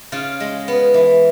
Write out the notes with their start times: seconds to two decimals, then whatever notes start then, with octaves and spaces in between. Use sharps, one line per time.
0.12 C#3 F4
0.40 G#3
0.68 B3
0.94 E3